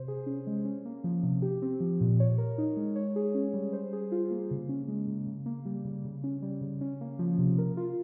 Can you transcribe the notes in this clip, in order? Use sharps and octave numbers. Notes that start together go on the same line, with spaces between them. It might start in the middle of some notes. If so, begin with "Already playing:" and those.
Already playing: C3 C5
G#4
C#4
G#3
C#4
A#3
F3
C3
G4
C4
F3
A#2
C#5
A#4
D#4
G#3
C#5
G#4
C#4
G3
C5
G#4
F4
A#3
C#3
C#4
G#3
C#3
C#3
A#3
G3
C#3
C#3
C#4
G3
C#3
C#4
A#3
F3
C3
A#4
F4